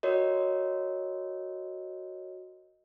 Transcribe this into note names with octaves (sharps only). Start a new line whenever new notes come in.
F#4 A#4 C#5 D#5